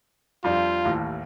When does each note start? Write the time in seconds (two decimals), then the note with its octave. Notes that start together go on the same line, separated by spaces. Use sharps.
0.44 F2 G3 D4 F4
0.85 A1 D#2 A2